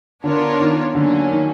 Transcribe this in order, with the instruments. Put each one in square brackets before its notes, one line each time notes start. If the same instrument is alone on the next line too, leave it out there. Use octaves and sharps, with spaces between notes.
[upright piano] D3 [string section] B3 D4 F4 A#4 C#5
[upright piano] D#3
[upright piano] D3 [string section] F#3 A#3 C#4
[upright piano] D#3